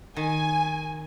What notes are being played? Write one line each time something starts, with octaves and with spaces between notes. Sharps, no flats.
D#3 G#5